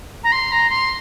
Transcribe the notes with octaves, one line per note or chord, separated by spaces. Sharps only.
A#5
C6
A#5
C6